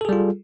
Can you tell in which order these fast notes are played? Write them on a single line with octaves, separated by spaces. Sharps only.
A4 G#4 G3 F4